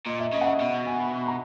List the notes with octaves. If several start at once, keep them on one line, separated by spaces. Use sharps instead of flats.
A#2 D#5
E5
C#3 D#5
F#5
E5
B2
G#5
A#5